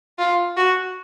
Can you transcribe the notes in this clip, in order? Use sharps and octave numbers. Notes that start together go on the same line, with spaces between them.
F4
F#4